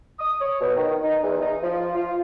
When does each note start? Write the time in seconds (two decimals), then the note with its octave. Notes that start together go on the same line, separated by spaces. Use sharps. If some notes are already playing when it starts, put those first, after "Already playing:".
0.19 D#6
0.41 C#5
0.60 B2
0.76 D#3
1.03 D#4
1.23 E2
1.40 D#4
1.62 F3
1.95 F4